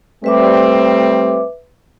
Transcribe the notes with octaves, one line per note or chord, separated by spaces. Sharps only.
G3 A3 C4 B4 E5 D6